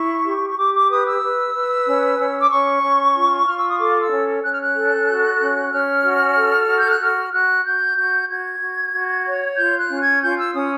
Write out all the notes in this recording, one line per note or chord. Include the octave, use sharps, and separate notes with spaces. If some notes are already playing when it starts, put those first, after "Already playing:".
Already playing: E4 C#6
G4
C#6
G4 D6
D6
B4 D#6
E6
B4
B4
C#4
C#4
D6
C#4 C#6
C#4
F4
F4 F6
E6
D#6
A4 D6
E6
C#4
C#4 F#6
F6
F#6
A4
F#4
C#4
C#4 F6
F#4
A4
F#4
G6
F#6
F#4 F6
F#4 F#6
F#4 G6
F#4 G6
F#4 G#6
F#4
F#4
C#5
F4 G6
F#6
C#4
G#6
F4 G6
E6
C#4 D#6